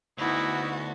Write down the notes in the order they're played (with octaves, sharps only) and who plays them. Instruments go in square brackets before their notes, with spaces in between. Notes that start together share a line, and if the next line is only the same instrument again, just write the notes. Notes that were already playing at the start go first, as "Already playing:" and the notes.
[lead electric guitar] D2 [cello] B3 F#4 [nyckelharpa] D#4 E4